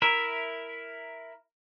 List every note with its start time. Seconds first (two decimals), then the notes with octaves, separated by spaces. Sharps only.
0.02 E4 A#4 E5